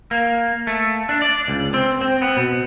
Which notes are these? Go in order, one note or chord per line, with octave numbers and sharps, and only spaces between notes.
A#3
A3
D4
D5
C#2
C4
C4
B3
B2